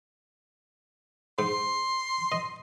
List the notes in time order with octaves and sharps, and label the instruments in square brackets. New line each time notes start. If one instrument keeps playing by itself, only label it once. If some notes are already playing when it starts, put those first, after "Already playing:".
[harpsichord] G#2 [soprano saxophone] C6
[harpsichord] D#5